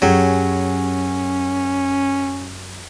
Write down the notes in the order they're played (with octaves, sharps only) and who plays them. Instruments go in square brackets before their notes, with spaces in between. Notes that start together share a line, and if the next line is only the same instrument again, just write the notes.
[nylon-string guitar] F#2 G4 G#4 [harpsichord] F#3 [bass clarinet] C#4